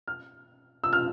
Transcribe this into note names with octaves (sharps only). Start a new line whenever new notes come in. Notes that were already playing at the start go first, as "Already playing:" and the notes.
F6
E6
F6